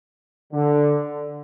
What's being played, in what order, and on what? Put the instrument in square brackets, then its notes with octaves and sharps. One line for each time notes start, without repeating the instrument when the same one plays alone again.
[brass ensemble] D3